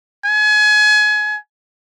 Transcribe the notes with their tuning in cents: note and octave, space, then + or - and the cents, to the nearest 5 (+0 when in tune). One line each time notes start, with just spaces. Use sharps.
G#5 +30